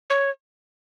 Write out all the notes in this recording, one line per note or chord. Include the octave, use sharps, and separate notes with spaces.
C#5